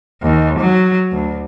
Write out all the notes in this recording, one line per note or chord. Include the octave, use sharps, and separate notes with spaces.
D#2
F#3
D2